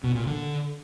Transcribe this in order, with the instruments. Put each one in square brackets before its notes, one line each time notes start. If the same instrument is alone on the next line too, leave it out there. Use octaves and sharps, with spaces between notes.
[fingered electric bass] B2
A#2
D3